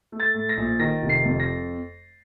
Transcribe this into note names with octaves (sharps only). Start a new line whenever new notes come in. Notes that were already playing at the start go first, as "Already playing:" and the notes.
A3
A6
A2
A#6
A#1
D#3 A#6
F1
C7
F2
A#6